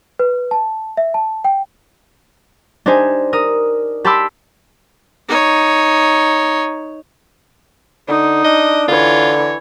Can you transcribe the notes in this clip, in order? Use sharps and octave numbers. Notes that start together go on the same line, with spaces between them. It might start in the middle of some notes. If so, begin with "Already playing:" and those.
B4
A5
E5
A5
G5
D4 D#4 G4 C5 G#5
A#4 D#6
G4 A5 B5 C6 D6 E6
D#4 C#5
D3 D#4
D4 D#5
D3 E3 F4 C#5